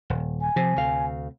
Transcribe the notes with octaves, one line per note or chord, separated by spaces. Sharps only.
D#1
G#5
C3 F3
D2 F5